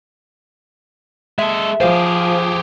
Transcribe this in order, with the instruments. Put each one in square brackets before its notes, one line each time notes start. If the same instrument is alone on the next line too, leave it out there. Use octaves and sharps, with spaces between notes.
[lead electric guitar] G#3 A4 [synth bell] E5
[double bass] F3 [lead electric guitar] G4 G#4 [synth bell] C5 F5